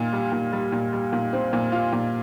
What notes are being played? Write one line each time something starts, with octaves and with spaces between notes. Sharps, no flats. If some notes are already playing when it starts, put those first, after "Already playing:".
Already playing: A#2 F4
G3
A#2
G3
A#2
G3
A#2
C4
A#2
F4
A#2